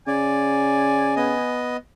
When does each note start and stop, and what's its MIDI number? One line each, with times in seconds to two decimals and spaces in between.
0.07 1.36 49
0.07 1.15 74
0.07 1.62 80
1.17 1.77 59
1.17 1.77 75